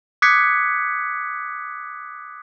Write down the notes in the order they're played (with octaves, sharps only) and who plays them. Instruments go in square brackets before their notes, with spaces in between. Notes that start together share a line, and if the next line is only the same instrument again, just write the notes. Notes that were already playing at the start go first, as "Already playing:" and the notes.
[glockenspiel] D6 D#6 F#6 G#6 B6 C#7